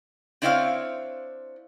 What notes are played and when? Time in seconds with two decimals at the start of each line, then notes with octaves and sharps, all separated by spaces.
0.42 C4 D4 E4 C5 C#5 F5